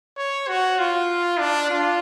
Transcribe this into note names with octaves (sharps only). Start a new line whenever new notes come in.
C#5
F#4
F4
D4
F4